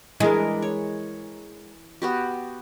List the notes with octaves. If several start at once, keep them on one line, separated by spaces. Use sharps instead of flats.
E3 G#3 D4 A#4
C#5
B3 F#4 G4